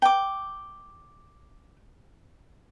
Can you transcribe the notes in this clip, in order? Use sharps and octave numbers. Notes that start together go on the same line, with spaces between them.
G5 D6